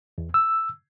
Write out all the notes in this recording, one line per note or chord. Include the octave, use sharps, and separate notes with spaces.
E2
E6